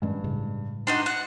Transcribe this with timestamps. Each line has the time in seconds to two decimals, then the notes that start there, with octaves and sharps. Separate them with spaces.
0.02 G2 D#3 G#3 C#4
0.24 A2 C#3 G#3
0.87 D4 D#4 F#4 C6 A6
1.06 F#5